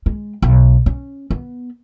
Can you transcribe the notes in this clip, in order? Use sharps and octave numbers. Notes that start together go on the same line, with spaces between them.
G#3
B1
C#4
B3